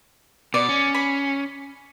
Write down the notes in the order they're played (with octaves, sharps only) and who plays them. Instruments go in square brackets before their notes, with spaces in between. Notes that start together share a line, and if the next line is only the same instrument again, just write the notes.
[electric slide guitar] B2 [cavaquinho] D5
[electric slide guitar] C#4
[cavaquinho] B5